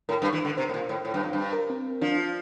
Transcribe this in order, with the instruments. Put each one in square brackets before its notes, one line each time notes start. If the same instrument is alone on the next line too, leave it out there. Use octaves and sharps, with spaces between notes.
[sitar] A2 [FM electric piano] A#4
[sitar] G2
E3
D3
[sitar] C3 [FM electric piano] C5
[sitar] A2
A#2
A2
A2
G2
F2
G2
[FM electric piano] A#4
C4
[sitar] F3 [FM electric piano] D4
[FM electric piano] F4